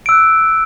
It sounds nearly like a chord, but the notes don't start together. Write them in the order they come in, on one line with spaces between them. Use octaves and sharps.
D7 E6 F#6